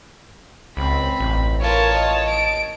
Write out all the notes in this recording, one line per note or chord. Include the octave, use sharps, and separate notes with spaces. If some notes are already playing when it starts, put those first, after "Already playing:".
C#2 C4 B5
A1
F4 A#4 C#5 A5
D#5
D7